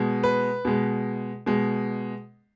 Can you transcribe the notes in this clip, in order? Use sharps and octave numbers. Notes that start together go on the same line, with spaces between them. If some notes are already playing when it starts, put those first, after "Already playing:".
Already playing: B2 G#3
B4
B2 G#3
B2 G#3